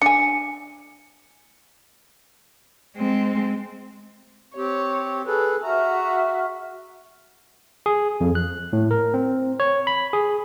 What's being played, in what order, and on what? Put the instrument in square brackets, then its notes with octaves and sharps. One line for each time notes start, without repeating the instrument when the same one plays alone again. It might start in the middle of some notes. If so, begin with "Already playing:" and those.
[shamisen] D4 G#5 [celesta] C#7
[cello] G#3 C4
[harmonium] C4 G4 [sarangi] C#5
[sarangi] G#4 [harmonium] A4 B4
[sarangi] F#4 [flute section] E5 C#6 F6 [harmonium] A#5
[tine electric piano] G#4
F2
F#6
A2
A#4
C4
C#5
B5
G#4